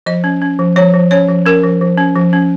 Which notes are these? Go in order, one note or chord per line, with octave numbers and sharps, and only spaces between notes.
F3 D#5
C#4
C#4
F3
F3 C#5
F3
C#4 C#5
F3
C#4 A#4
F3
F3
C#4
F3
C#4